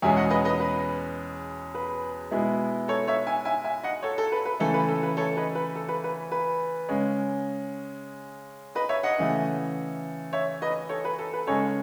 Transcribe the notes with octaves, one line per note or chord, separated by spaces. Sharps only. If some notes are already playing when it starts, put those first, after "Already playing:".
E2 B2 G#3 C#4 E5 G#5
D#5 F#5
B4 D#5
B4 D#5
B4
B4
B2 G#3 B3 E4
A4 C#5
C#5 E5
E5 G#5
E5 G#5
E5 G#5
D#5 F#5
A4 C#5
A4
B4
B4
C#3 E3 A3 A4
B4
A4
B4
A4 C#5
B4 D#5
B4
A4
B4
B4
B4
C#3 G#3 C#4
B4 D#5
C#5 E5
D#5 F#5
C#3 E3 A3
C#5 E5
B4 D#5
A4 C#5
B4
A4
B4
C#3 G#3 C#4 A4 C#5